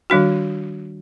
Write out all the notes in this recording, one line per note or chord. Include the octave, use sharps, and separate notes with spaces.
D#3 G3 D4 F#4